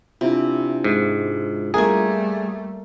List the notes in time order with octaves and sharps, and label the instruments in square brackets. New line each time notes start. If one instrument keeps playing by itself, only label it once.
[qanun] C3 [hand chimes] D4 E4 F4
[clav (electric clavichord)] G#2
[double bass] G3 A3 [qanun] A#3 G#5 [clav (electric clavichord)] G#4